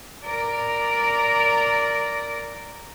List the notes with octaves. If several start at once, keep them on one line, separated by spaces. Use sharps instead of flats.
A#4 D5